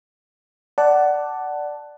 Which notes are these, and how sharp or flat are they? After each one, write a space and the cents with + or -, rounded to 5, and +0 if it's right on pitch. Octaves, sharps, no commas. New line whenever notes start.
D5 +0 F#5 +15 A5 +0